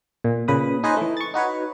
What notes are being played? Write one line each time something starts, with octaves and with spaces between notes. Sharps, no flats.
A#2
A#2 C#3 B4 B5 D#6
C#4 D#4 G#4 B4 C5 D#5
E3 A3
C#6 A6
D#4 F#4 B4 C#5